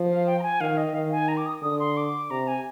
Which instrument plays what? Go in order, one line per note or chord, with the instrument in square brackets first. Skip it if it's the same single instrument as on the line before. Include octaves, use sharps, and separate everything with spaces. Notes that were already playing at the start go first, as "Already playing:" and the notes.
Already playing: [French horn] F3
[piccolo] F5
G5
A#5
G#5
[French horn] D#3 [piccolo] F5
[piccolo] D#5
[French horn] D#3 [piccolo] F5
[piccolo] G#5
A#5
D6
D#6
[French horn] D3 [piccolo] D#6
[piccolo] C6
D6
[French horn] C3 [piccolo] A#5
[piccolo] G#5